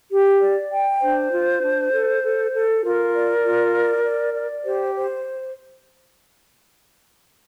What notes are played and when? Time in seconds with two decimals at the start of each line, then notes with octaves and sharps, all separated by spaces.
0.11 G4
0.41 D5
0.71 G5
1.01 D4 C5
1.32 F4
1.62 D4
1.92 A4
2.23 A4
2.53 A4
2.83 F4 A#4
3.14 D5
3.44 F4
3.74 D5
4.05 D5
4.34 D5
4.64 G4 C5
4.95 C5